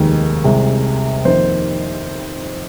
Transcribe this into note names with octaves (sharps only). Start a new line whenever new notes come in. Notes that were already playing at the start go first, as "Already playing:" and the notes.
Already playing: F1 D#2 D#3 G#3
C2 C3 G#3
F2 D#3 A#3 C5